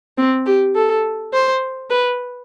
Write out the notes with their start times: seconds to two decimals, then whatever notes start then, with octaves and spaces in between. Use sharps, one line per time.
0.18 C4
0.46 G4
0.75 A4
1.33 C5
1.90 B4